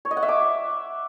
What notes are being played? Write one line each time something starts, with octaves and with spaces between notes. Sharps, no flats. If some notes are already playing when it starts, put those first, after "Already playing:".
C#5
D#5
F#5
E5
D6